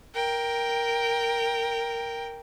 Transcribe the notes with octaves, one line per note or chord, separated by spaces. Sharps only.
A#4 G5